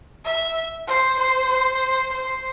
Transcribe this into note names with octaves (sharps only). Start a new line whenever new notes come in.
E5
C5
C5
C5
C5